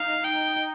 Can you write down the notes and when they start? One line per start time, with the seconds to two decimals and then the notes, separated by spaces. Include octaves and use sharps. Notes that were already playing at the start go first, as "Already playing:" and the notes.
Already playing: D#4 F5
0.24 G5